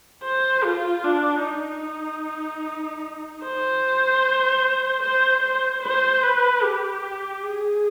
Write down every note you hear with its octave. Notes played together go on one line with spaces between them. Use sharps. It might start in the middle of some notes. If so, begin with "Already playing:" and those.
C5
F4
D4
D#4
C5
C5
C5
C5
B4
G4
G#4